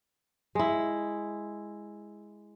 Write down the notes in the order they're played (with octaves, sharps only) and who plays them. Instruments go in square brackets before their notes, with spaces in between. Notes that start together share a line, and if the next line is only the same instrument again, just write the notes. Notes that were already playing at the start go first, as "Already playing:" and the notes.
[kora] G#3 E4